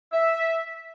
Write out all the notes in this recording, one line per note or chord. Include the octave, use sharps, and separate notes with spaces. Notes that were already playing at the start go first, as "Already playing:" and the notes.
E5